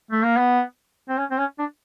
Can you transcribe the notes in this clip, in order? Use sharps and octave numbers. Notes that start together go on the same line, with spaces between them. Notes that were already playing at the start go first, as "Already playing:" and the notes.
A3
A#3
B3
C4
C#4
C4
C#4
D4